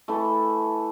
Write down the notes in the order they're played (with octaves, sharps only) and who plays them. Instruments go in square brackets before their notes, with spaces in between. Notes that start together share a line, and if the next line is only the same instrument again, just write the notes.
[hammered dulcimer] E3 A3